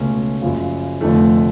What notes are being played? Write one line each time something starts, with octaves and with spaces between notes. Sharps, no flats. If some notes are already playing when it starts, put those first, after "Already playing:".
Already playing: C#2 B2 A3 C#4
F#1 F#2 C#3 F3
F1 F2 D3 F3 A3